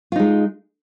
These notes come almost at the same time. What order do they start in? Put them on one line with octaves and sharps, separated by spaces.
F4 D#4 G#3